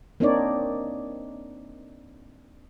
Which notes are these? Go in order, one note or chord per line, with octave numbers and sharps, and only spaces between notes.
A#3 C4 D4 D#4 C#5 D5